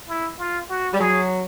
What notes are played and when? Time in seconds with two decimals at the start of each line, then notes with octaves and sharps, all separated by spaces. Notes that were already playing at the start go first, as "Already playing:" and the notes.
0.08 E4
0.39 F4
0.69 F#4
0.93 G3
0.99 F#3 G#4